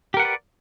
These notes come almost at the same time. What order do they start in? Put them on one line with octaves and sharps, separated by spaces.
G4 A#4 F#5 B4 D5